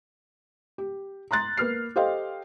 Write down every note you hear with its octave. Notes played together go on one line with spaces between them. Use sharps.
G4
A#5 C6 F#6 A6
A#3 B4 F6 C7
G4 A4 C5 D#5 F5 G5